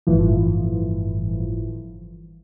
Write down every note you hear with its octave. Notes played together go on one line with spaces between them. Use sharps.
G1 A2 E3 F3